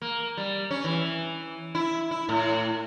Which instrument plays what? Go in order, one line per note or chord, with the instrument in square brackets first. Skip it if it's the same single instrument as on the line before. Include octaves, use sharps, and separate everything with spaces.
[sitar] A#3
G3
C#4
E3
E4
E4
A2